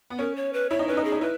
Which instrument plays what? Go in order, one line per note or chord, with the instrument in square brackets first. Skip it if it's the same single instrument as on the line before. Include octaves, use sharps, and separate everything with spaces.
[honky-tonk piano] B3
[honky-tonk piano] C#4 [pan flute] A#4
[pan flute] C#5
B4
[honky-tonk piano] E4 [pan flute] C#5
[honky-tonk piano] D#4
[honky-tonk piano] C#4 [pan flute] B4
[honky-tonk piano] D#4
[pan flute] G#4
[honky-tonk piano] D#4
[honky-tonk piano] E4 [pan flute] B4